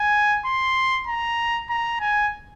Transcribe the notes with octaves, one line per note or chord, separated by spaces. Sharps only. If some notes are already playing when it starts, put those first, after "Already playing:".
Already playing: G#5
C6
A#5
A#5
G#5